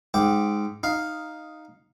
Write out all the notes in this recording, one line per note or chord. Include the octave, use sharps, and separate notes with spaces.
G#2 G5 D6
D#4 F5